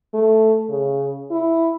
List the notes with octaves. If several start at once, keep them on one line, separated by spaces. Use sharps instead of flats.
A3
C#3
E4